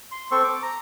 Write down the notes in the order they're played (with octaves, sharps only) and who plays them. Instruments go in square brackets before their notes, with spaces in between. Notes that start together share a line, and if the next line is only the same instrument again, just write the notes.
[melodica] C6
C4 A4 C5 C#6
D6
A#5